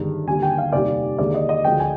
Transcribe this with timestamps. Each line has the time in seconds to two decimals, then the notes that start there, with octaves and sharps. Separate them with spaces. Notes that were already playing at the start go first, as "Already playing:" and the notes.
Already playing: G1 G2 D#3 G#3
0.27 D#2 D3 G3 G#5
0.43 G5
0.58 F5
0.73 F1 D#2 D#3 G3 D5
1.19 D#2 D3 G#3 D5
1.34 D#5
1.49 D#5
1.64 D2 D3 F3 G#3 G5
1.80 G#5